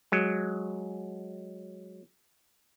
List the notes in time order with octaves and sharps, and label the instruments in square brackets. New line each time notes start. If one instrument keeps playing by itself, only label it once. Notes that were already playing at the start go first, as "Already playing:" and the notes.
[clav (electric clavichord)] F#3 G#3